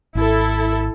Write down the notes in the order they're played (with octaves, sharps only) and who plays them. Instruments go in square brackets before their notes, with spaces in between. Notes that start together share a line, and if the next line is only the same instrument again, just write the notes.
[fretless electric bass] G#1 [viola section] E4 A4